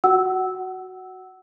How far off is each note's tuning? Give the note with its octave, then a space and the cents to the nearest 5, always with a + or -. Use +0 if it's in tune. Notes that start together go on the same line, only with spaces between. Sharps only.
F#4 +0 F#5 +25 E6 -10